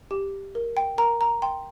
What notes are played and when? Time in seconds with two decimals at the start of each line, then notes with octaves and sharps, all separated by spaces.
0.11 G4
0.55 A#4
0.77 G5
0.98 A#4 A#5
1.21 A#5
1.42 G5 C6